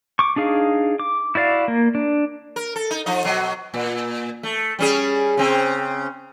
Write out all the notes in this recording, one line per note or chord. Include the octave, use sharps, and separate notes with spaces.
C#6 D6
D4 D#4 G#4 F5
D6
E4 F#4 D5 F5
A#3
D4
A#4
A4
D#4
F3 D#4 D#5
B2 F#3
A#2
A3
G3 C#4 G#4
C#3 C4